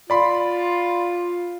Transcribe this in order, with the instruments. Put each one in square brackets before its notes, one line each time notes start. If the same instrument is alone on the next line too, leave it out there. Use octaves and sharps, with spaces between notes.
[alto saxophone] F4 [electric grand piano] D5 B5 C6